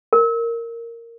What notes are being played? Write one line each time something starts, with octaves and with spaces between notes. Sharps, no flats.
A#4